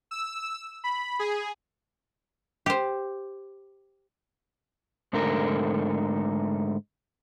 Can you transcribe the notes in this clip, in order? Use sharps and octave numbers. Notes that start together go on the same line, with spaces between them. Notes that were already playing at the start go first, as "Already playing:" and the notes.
E6
B5
G#4
G4 C5
G#2 D3 A3 A#4